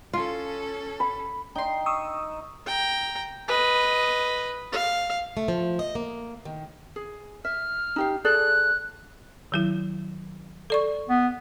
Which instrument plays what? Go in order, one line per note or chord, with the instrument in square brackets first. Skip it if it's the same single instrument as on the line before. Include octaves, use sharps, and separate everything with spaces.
[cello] C#4 A4 [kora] F4
[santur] B5
[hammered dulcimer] D#4 [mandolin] G5 C6
[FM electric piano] C#6 D#6 E6
[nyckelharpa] G5 A#5
B4 D#5
F5
[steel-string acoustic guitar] A3
F3
D#5
A#3
D#3
[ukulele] G#4
[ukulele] E5 [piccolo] F6
[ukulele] D#4 G4 F5
[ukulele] G#4 A4 D5 [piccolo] F#6
[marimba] D#3 F#3 E4
A4 D5 C#6
[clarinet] B3